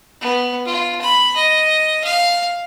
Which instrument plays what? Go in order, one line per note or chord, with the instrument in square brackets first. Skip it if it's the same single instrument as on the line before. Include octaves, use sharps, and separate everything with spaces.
[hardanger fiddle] B3
F4
B5
D#5
F5